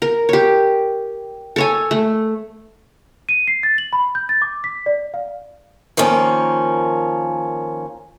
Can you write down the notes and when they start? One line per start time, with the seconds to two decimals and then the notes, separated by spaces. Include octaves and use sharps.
0.02 A#4
0.29 G4 C#5
1.56 A4 C#5 G#5
1.91 A3
3.29 D#7
3.47 C7
3.63 A6
3.78 F#7
3.93 B5
4.15 G6
4.29 A6
4.42 D6
4.64 B6
4.86 D5
5.14 F5
5.97 D#3 F3 A#3 C#4